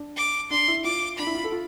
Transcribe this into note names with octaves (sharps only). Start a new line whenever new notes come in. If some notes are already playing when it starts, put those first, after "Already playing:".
Already playing: D4
D6
D4 C6
E4
F4 D6
D4 B5
E4
F4
A4
F4